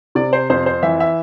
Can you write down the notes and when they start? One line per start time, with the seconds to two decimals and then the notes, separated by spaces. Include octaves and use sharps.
0.15 C3 D5
0.33 C5
0.50 F2 C5
0.66 C5
0.83 E3 E5
1.00 E5